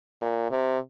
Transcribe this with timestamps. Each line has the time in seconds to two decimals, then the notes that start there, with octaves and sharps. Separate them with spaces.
0.22 A#2
0.51 C3